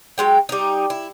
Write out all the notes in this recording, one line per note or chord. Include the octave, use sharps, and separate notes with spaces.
F#3 G#3 G5
G3 D#4
E4